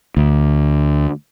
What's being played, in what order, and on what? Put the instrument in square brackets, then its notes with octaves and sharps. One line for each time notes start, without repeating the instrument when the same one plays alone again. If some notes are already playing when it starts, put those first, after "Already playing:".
[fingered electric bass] D2